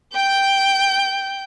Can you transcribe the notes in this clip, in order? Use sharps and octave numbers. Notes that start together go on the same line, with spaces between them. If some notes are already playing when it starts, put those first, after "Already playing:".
G5 G6